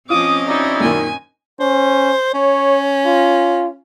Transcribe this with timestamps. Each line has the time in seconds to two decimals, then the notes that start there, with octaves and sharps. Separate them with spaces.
0.10 F3 C4 C#4 F4 D#5 D6 D#6
0.47 D#4 E4 F#4 D5
0.80 F#2 A#2 D#3 G#5
1.60 C#4 C5
2.34 C#4 C#5
3.06 F4